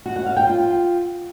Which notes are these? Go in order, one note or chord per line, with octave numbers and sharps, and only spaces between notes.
F#4
F#5
F5
G5
F4